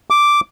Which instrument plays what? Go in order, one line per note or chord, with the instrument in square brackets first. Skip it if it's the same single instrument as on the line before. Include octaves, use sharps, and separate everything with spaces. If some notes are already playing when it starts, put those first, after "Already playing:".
[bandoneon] D6